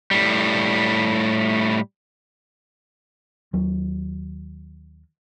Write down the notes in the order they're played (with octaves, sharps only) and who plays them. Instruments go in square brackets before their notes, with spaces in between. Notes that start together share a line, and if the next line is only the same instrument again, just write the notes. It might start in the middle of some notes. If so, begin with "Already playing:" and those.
[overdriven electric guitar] A2 G3
[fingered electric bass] D#2 F#3